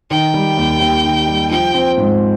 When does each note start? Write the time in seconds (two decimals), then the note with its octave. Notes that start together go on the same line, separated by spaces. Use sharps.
0.11 D#3 G5
0.34 G3
0.57 D#2
0.80 D#2
1.04 D#3
1.28 G3
1.51 F3 G5
1.74 C4
1.98 G#2